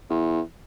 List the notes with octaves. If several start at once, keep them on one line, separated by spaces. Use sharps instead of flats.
E2